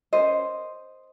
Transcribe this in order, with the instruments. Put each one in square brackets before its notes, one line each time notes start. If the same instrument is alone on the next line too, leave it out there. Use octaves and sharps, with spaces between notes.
[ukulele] C#4 F4 A#4 C5 D#5